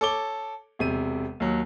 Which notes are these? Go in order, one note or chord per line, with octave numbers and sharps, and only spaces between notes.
A4 C#5 D6 G7
E1 C3 D#7
D#2 F#3